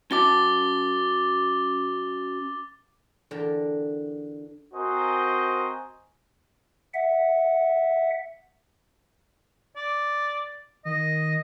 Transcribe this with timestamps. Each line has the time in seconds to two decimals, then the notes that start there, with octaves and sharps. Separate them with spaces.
0.11 C#4 F#4 A5 D6 A6 G7
3.31 E2 D3 A#4 G5 A5
4.74 C4 F#4 A#4 C5 D#5 G#5
6.94 E5 F#5
9.76 D5
10.85 D#3 D#5